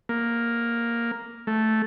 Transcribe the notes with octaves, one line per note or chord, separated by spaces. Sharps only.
A#3
A3